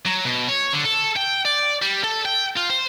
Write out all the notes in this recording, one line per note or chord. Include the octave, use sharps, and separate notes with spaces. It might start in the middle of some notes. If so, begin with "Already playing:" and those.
F#3
B2
C#5
D3
A4
G5
D5
G3
A4
G5
F4
C5